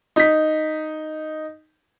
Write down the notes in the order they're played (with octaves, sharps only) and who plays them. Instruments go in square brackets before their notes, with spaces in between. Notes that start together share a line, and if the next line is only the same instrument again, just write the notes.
[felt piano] D#4 B6